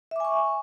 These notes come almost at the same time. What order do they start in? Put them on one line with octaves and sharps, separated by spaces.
E5 D6 G#5 C#6